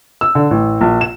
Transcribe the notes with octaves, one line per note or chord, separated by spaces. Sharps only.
E6
D3
A1
A#1
E7